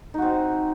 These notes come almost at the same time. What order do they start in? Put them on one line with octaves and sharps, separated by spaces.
D#4 F#4 C4